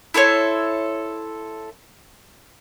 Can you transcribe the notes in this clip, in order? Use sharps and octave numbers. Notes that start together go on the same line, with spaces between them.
E4 A4 C5 C#5